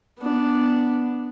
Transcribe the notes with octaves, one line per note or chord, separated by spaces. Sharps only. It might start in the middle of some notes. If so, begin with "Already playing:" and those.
B3 D4